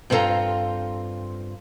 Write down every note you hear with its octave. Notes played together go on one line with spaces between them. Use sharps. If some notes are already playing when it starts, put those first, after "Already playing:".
G2 C4 E4 F4 A4 A#5